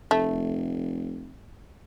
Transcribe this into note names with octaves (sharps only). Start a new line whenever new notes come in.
F1 A3